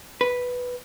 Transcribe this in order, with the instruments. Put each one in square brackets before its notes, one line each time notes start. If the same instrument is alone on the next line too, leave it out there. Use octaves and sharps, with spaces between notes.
[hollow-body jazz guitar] B4